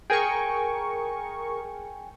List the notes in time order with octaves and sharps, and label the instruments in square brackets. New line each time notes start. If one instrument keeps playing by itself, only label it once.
[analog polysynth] G#4 A#4 C#6 [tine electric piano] G5 G#5